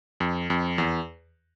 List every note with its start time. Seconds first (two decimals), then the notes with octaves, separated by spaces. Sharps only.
0.20 F2
0.50 F2
0.78 E2